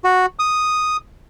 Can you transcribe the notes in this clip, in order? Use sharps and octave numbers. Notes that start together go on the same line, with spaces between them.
F#4
D#6